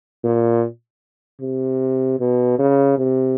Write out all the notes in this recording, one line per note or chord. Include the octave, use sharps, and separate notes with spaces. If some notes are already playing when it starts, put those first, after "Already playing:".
A#2
C3
B2
C#3
C3